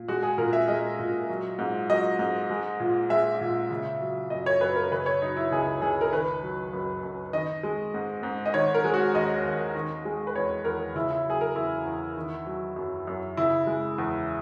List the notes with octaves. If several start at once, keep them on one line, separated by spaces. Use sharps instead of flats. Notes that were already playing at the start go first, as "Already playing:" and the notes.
Already playing: A#2
G#3 F#4
G#4
A#2 A#4
E5
G#3 D#5
A#2
F#3
G#2
F#3 D#5
G#2
G#3
A#2
G#3 E5
A#2
C#3
F#3
F#2 D#5
C#5
F#2 B4
A#4
C#3 B4
C#5
F#3 D#4
E4
C#2 G#4
C#2 G#4
A#4
D#3 B4
F#3
F#2
F#2
D#3 D#5
G#3
G#2
G#2
D#5
D#3 C#5
A#4
G#3
F#4
D#2 D#5
D#2
D#3
G#3
B4
E2 C#5
E2 A#4
C#3 E4
E4
F#3 G#4
A#4
E2 E4
E2
D#3
F#3
F#2
F#2
C#3 E4
G#3
E2